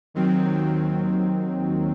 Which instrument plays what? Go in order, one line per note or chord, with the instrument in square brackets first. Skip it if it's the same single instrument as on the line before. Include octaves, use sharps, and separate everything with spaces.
[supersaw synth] D#2 D#3 F#3 C4